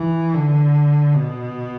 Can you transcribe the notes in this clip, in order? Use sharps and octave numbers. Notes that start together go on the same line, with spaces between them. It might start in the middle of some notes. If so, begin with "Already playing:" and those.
Already playing: E3
D3
B2